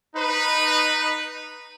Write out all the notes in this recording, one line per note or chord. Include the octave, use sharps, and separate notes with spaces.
D#4 B4